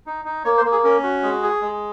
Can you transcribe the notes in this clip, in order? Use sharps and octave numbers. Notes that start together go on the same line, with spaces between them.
D#4
D#4
A#3 C#5
C5
A#3
G#4
C#4 A#4
F#4
G#3
G#4
G#3